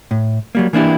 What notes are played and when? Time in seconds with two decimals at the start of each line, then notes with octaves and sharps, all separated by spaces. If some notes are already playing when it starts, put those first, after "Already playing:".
0.11 A2
0.55 F#3 G3 A#3
0.73 E3 A#3 D4 E4 G4